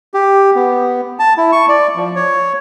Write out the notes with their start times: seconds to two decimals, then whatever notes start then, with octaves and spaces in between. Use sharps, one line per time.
0.14 G4
0.55 B3
1.19 A5
1.37 E4
1.52 C#6
1.69 D5
1.96 F3
2.16 C#5